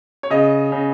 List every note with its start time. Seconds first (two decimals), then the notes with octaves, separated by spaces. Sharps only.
0.23 C#5
0.30 C#3 D#5
0.72 C#3